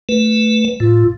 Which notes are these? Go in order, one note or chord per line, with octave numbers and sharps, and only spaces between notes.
A3 B4
A2 F4